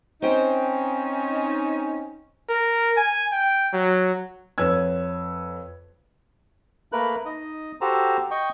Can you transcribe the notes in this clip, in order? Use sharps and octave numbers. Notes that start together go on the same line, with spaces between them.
C4 C#4 D#4 C5 G5
A#4
G#5
G5
F#3
F2 B4 C#5 E6 G#6
A3 A#3 A#4 B4 F#6
D#4 D#5
F#4 G4 A4 C5 A#5
D#5 G5 C#6